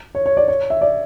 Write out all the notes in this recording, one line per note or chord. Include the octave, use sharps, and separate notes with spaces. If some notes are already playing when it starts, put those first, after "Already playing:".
C#5
C#5
D5
C#5
E5
D5